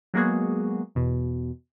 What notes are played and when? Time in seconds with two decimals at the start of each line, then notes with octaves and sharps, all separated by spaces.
0.14 F#3 G#3 A#3 B3 F#4 G#4
0.95 E2 B2